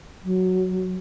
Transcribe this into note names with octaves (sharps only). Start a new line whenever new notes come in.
F#3